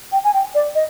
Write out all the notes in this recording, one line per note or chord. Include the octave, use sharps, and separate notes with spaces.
G5
G#5
G5
D5
D#5